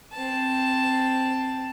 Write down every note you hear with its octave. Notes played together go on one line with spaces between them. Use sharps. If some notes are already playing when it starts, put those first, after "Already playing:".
C4 A5